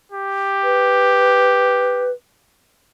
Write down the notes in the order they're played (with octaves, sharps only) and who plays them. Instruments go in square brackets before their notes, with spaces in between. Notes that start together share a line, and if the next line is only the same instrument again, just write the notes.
[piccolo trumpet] G4
[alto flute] B4